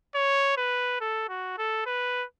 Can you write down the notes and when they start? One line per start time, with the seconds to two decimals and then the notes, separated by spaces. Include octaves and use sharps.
0.15 C#5
0.57 B4
1.00 A4
1.29 F#4
1.58 A4
1.86 B4